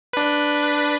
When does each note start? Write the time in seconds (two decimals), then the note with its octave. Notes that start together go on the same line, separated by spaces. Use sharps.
0.13 D4 B4